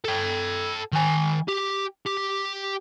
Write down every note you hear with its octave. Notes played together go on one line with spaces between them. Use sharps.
A4 G5
D#3 G#5
G4
G4